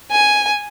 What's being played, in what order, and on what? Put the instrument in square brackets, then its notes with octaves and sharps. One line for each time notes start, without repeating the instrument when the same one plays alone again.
[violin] G#5